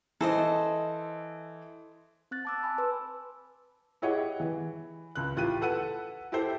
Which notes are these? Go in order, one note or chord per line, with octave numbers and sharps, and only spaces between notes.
E3 A4 C5 D#5
C4 F#6 A6
A5 D6 E6
G#5 A5 B5
B4 C6 E6
E4 G4 G#4 C#5 D#5 F#5
E3
C#2 F#6
A1 F4 G4 F#6 D#7
A4 B4 F#5 E6 F#6 D#7
E4 G4 A4 C5